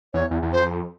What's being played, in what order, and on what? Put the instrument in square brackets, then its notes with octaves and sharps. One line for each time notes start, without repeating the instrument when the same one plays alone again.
[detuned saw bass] E2 [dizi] C#5
[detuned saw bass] E2
E2
[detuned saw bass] F2 [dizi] C5